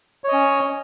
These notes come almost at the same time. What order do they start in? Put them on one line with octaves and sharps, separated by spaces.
C#5 D#5 C#4